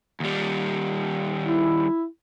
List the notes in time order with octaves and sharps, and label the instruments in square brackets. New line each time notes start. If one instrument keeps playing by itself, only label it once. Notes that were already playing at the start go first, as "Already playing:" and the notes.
[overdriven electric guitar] D#2 G3
[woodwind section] E4